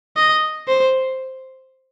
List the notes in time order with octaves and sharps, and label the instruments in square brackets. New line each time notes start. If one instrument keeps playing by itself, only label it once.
[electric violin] D#5
C5